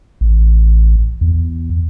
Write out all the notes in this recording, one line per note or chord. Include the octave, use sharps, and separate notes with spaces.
A1
E2